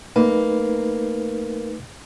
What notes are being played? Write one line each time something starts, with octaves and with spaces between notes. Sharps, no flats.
A3 A#3 D#4 B4